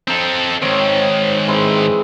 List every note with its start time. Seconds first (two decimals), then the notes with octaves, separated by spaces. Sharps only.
0.08 C4 D#4 A4
0.62 G#2 D#3 C4 C#5
1.47 E3 G#3 C4